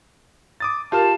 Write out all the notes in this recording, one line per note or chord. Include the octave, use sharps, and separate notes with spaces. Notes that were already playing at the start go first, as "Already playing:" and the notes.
D6 D#6 A6
F4 G4 A#4 F5 A5 F6